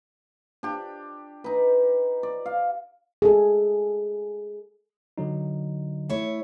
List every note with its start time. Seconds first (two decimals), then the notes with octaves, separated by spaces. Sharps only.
0.63 D4 G4
1.44 D#4 B4
2.23 D5
2.46 F5
3.22 G#4 A4
5.18 D3 F#3 D#4
6.09 A3 E4 C#5